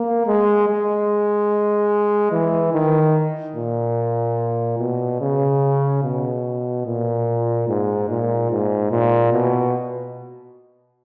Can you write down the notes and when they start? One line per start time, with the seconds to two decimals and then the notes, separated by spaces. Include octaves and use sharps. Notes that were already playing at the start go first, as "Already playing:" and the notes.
Already playing: A#3
0.26 G#3
0.68 G#3
2.32 E3
2.74 D#3
3.56 A#2
4.79 B2
5.20 C#3
6.03 B2
6.86 A#2
7.68 G#2
8.09 A#2
8.51 G#2
8.92 A#2
9.33 B2